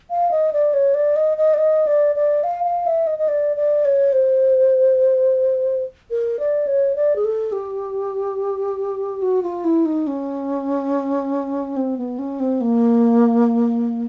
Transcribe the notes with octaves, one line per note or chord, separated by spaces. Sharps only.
F5
D#5
D5
C#5
D5
D#5
D#5
D5
D#5
D5
D5
F5
F5
E5
D#5
D#5
D5
D5
C#5
C5
A#4
D5
C#5
D5
G#4
A4
G4
F#4
F4
E4
D#4
C#4
C4
B3
C#4
C4
A#3